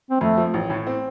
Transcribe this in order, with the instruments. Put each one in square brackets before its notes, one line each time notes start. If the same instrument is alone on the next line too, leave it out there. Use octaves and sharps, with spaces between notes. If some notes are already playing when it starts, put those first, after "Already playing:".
[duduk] C4
[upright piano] F2 [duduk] A3
[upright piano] F3
A1
A2
C4